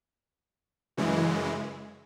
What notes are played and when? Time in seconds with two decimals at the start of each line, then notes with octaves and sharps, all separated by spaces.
0.97 F#2 C#3 E3 G#3